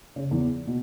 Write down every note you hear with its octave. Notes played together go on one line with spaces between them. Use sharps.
C#3
E2 E3
B2